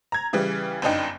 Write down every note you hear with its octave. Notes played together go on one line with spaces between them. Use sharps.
A#5 G#6
C#3 E3 G3
G1 F#2 D4 D#4 G5